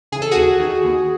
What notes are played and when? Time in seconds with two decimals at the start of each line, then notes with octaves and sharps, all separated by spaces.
0.12 C#3 E3 G#4
0.22 A4
0.31 D#2 F#4 G#4
0.60 D#3
0.84 D#2